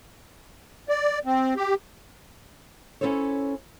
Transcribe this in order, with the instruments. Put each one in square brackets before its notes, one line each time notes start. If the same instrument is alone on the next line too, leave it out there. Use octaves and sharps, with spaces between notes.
[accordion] D5
C4
G4
[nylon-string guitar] C#4 D4 E4 A4 C5 C#5